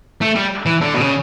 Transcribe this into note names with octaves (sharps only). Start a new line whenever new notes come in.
A3
G3
E3
D3
B2
C#3